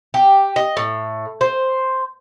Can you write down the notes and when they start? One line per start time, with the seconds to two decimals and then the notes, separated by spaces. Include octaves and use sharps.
0.14 G4
0.56 D#5
0.77 A2
1.41 C5